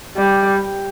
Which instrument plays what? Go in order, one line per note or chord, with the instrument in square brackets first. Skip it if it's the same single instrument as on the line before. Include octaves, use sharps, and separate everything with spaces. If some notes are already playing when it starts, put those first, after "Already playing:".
[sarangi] G3